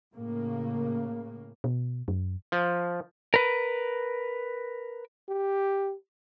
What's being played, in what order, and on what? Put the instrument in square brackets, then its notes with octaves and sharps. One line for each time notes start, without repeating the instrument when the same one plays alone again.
[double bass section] A2 C#3 A#3
[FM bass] B2
F#2
[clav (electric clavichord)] F3
[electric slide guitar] A#4 B4
[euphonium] G4